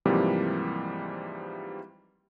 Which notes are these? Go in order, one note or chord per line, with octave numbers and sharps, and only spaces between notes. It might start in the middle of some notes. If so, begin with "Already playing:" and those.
G#2 C3 E3 F3 G3 A#3